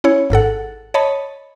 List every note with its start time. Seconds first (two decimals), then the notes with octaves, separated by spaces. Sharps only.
0.04 C#4 E4 C#5
0.30 G#1 G#2 A4 F#5
0.94 C#5 D#5 A5 B5